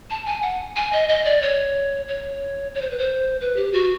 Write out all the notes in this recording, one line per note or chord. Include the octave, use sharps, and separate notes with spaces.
A5
G#5
F#5
G#5
D#5
D#5
D5
C#5
C#5
C#5
C5
B4
C5
B4
G4
F#4